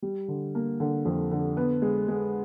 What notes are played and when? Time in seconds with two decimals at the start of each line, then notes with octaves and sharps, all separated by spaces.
0.02 G3
0.28 D3
0.55 A#3
0.80 D3
1.05 F2
1.31 D3
1.57 B3
1.82 G#3
2.08 G#3